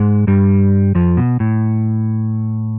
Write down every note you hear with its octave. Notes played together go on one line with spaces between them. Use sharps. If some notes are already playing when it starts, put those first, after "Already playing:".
Already playing: G#2 G#3
G2 G3
F2 F3
B2
A2